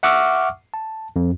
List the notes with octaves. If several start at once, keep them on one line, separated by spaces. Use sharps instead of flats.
E5 F#5 C#6 D6 E6 F6
A5
F2